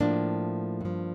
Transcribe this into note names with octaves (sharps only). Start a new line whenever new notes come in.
A2 F3 A#3 D4
G2 F3